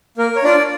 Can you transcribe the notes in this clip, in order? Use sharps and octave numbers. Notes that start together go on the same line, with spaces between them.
A#3 A#4
C#5
D4 F4 D5